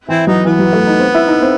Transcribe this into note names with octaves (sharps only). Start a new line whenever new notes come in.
E3 C4 E4
F#3 B3 D#4
E3 B3
F#3
A3
D#4
C4
E4
D#4
C4